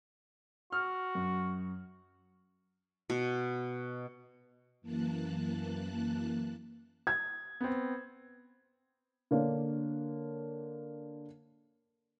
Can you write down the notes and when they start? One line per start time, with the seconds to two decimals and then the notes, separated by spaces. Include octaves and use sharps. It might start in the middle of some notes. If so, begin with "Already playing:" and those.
0.72 F#4 F6
1.15 F#2
3.10 B2
4.81 F#2 E3 A#3 A5 F#6
7.07 G#6
7.61 B3 C4
9.31 D3 A#3 D4 C#5